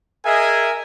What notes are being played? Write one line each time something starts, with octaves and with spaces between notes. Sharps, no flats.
G#4 A#4 D#5 E5 G#5